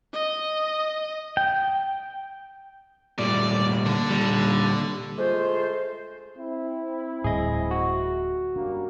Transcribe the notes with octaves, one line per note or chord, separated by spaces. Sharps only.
D#5
G5
A#2 G3 A3 D5
D3
A#2 G3
G#3 A3 F4 C5
C4 E4
D1 A2 G3 G#4 D#5
F#4
F#2 G3 A#3 D4